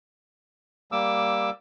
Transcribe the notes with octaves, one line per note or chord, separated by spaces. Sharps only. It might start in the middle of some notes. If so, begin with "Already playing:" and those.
G3 A#3 D6 E6